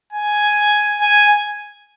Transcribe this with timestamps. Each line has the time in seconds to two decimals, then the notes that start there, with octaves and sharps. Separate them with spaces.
0.12 G#5
1.01 G#5